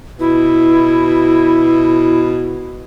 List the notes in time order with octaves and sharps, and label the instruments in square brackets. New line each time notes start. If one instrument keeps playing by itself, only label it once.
[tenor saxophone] B2 [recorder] E4